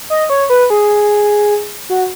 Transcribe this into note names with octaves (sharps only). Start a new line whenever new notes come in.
D#5
C#5
B4
G#4
F#4